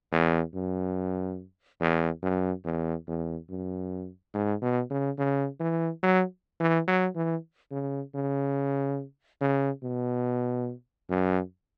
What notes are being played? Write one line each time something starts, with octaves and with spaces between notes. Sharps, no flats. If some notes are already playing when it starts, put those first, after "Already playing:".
E2
F#2
E2
F#2
E2
E2
F#2
G#2
B2
C#3
C#3
E3
F#3
E3
F#3
E3
C#3
C#3
C#3
B2
F#2